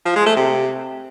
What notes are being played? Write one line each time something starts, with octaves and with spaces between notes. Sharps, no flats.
F3
G#3
A3
C3